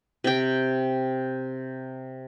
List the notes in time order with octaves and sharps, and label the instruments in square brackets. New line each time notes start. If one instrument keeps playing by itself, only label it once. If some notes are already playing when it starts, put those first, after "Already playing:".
[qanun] C3 G5